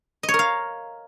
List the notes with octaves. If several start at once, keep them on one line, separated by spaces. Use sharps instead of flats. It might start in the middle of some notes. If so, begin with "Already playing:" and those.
D#5
C#5
A#4
F5